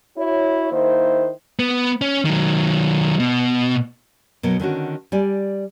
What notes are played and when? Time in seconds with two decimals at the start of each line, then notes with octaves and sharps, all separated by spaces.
0.17 E4 F#4 C#5
0.72 D#3 A#3 E4 C5
1.59 B3
2.01 C#4
2.25 D#3 F#3
3.20 B2
4.43 B2 F#3 B3 A#4
4.60 D3 D#3 C#4 F#4
5.12 G3 D5 G#5